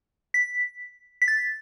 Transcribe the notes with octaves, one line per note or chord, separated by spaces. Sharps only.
B6
B6
A6